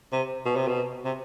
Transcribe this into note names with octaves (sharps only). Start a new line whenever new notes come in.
C3
B2
C3
B2
C3